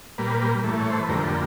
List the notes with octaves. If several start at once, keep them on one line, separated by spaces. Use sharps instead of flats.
A#2 G3 A#3 B4
A2 E3 A3
C#5
C5
B4
F2 D3 G3 A#3 A#4
A4